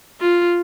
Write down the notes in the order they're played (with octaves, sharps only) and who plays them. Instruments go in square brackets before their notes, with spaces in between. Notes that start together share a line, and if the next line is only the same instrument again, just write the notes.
[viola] F4